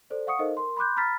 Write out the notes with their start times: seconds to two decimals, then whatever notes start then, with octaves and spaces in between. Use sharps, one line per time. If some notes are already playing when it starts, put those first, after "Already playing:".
0.10 A4 C5 D5
0.27 F5 F#5 C#6 D#6 C#7
0.39 D#4 A4 A#4 C5 D#5 F5
0.57 A#4 C6
0.77 B5 C6 D6 F#6 G6
0.96 A#5 B5 F6 A6 B6